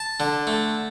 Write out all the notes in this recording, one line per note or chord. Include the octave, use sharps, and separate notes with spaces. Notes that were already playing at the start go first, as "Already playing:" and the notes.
Already playing: A5
D3
A3